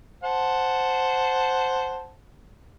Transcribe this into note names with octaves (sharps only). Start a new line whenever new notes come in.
C5 F#5 A5